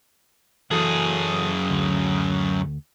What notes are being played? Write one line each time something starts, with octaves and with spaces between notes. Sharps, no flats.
F#2 E3 F#4 G#4 A4
D2